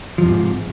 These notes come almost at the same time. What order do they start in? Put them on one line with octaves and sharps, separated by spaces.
F3 F2 C3 G#2